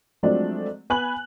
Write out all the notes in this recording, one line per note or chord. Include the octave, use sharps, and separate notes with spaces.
F3 F#3 G#3 A3 C4 D4
B3 G#5 B5 F#6 F#7